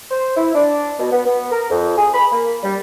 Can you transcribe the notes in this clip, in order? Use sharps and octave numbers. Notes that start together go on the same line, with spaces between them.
C5
E4
D4
B2
B3
B3
A#4
F2
G#4
B5
A#3
G3